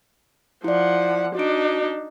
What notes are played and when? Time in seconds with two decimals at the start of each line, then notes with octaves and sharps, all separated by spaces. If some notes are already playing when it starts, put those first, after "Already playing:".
0.64 F3 E4 D5 F#5
1.35 D4 D#4 F#4 D7